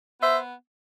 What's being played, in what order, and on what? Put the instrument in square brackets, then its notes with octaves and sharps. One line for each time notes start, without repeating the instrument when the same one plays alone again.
[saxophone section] B3 C5 E5